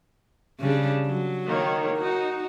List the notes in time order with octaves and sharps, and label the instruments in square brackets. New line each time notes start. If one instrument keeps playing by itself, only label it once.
[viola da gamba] C#3 G3 D4
F#3
[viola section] D#3 A#3 C#5
[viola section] D#4 [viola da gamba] F#4